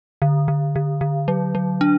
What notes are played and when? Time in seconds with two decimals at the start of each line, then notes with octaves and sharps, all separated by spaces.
0.22 D3
0.48 D3
0.76 D3
1.01 D3
1.28 F#3
1.55 F#3
1.81 D4